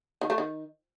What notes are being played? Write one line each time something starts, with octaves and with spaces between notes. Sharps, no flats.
D#3
A3
D#3